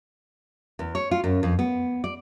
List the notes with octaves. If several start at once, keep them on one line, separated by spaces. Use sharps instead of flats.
E2
C#5
F4
F#2
F2
B3
D5